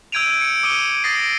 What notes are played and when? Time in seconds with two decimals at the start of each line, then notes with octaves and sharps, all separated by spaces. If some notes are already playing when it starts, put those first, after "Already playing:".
0.12 E6 G6 G#6 D7 D#7 F7
0.41 C#7 D7
0.63 D6 D#6 C#7 D#7 G7
1.04 D#6 A6 A#6 C7 D7